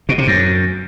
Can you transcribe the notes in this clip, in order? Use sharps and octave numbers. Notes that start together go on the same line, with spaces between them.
B2
C3
F#2